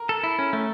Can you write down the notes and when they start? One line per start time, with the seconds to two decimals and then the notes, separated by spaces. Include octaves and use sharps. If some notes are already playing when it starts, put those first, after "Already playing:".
Already playing: A#4
0.09 A4
0.24 E4
0.39 C#4
0.53 A3